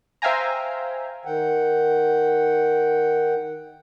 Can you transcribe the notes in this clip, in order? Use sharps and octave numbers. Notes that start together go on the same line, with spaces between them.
C5 E5 F5 G5 G#5 A#5
D#3 F#5 G5